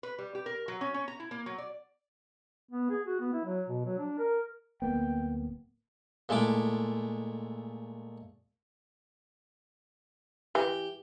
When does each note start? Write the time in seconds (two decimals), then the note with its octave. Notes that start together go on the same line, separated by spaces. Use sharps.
0.03 B4
0.18 G3
0.35 G4
0.46 A#4
0.68 F#3
0.81 C#4
0.94 C#4
1.08 A#5
1.20 E4
1.31 A#3
1.46 F#3
1.58 D5
2.71 B3
2.90 G#4
3.07 F#4
3.20 B3
3.33 E4
3.44 F#3
3.68 B2
3.85 F#3
3.99 D4
4.18 A#4
4.82 D1 A#3 B3 G5
6.29 A#2 G#3 A3 E4 D6
10.55 E3 G4